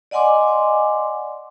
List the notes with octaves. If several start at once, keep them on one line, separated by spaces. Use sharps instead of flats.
D5 D#5 F#5 G#5 C6 D6